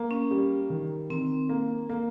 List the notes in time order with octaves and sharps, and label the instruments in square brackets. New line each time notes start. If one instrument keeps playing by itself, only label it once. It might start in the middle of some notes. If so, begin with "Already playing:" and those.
Already playing: [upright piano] A#3
[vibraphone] C#4
[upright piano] G3
D#3
[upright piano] D#3 [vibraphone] C4
[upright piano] A#3
A#3